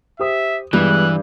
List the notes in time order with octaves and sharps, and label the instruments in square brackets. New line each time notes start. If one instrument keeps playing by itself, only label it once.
[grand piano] G4 C5 D#6 [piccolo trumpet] E5
[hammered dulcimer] G2 [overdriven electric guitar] E3 [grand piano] G3 G#3 B3 [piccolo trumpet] F#6